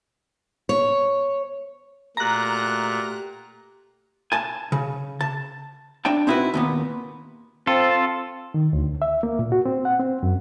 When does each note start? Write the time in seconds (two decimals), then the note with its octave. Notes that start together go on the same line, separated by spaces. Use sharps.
0.69 C#5
2.17 A#2 A3 F#4 G4 A#5 F#6
4.32 G#5 A5
4.72 C#3
5.21 A5
6.05 D4 D5 G5 A5
6.27 C4 D#4 E4 F#4 B4
6.54 D#2 A#2 B3
7.67 C4 F4 A4
8.54 D#3
8.73 D2
9.02 E5
9.23 A#3
9.39 A#2
9.52 F#4
9.66 C4
9.85 F#5
10.00 C4
10.23 F#2